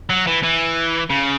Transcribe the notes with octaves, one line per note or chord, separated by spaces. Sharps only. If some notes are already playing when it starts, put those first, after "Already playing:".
F#3
E3
E3
C#3